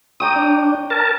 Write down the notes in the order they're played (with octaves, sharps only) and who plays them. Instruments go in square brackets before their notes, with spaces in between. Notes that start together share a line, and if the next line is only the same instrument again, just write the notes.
[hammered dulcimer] C#5 G5 A#5 [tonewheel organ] D#6
[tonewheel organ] D4
A#4 A5